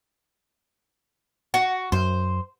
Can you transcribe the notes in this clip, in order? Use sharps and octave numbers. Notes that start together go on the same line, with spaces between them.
F#4
F#2 C5